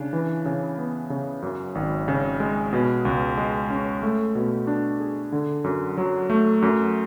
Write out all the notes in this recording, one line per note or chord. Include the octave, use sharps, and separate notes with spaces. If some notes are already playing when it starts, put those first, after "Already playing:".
Already playing: C#3 D4
E3
C#3
B3
C#3
F#2
G#1
C#3
G#3
B2
C#2
G#3
C#4
A3
B2
D4
G#4
D3
F#2
F#3
A3
F#2